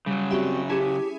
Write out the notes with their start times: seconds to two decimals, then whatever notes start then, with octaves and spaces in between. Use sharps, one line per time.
0.06 C#3 F#3 G3
0.31 G3 C4 F#4 G4 E5
0.69 C#4 E4 G4 G#4 A5